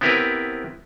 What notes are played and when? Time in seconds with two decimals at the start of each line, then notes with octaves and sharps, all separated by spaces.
0.01 B3 C4 E4 G4 A#4 B4